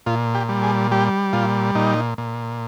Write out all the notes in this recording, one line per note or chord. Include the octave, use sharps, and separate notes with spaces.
A#2 F4
G4
G3
G#4
G3 G4
A#2 F4
A#2 D#4
A#2